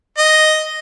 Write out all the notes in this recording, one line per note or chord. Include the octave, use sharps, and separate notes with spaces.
D#5